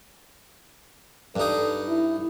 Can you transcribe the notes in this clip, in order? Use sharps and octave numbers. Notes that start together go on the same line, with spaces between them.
G2 D#4 A4
E4